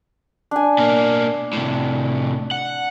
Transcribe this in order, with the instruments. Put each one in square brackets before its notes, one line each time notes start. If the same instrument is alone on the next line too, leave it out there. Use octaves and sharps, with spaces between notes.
[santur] D4 G#5
[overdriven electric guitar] B2 A#3
A2 C3
F#5